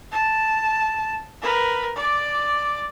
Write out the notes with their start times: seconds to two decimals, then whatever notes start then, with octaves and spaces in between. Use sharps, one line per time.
0.11 A5
1.42 A#4 B4
1.96 D5 D6